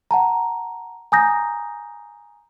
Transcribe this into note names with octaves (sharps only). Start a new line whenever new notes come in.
F#5 A5 A#5
G#5 A#5 D#6 G6 A#6